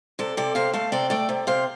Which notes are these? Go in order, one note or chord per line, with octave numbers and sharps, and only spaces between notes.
C3 A4 D5
C3 A4 D5
C3 C5 F5
A3 F5 A5
C3 D5 G5
A3 D5 G5
C3
C3 C5 F5